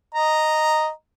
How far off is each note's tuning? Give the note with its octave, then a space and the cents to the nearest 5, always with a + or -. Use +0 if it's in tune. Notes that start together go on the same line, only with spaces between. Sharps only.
D#5 -5 A#5 -5